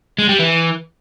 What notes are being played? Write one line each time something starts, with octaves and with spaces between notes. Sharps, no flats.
G#3
G3
E3